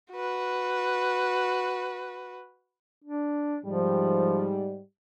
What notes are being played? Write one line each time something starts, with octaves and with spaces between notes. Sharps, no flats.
F#4 B4
D4
G#2 F3 G3